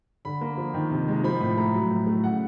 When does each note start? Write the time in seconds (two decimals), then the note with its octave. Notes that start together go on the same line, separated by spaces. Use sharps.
0.25 D3 B5
0.41 A#3
0.57 F3
0.74 D#3
0.91 C3
1.08 G#3
1.24 F3 B5
1.40 A2 B5
1.57 A3 A#5
1.74 F#3
1.90 A2
2.07 A3
2.24 C#3 F#5